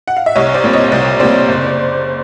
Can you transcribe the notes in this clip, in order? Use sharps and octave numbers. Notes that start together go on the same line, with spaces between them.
F#5
F5
E5
C2 C#5 D#5
C5 D5
A#2 G3 C4
C#5 D#5
C2 C5 D5
A#2 G3 C4 C5 D5
F#1